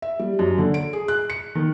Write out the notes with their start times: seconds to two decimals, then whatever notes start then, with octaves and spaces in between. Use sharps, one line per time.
0.02 E5
0.19 G3
0.39 F#2
0.58 D3
0.74 D7
0.93 G#4
1.08 F#6
1.30 C#7
1.55 D#3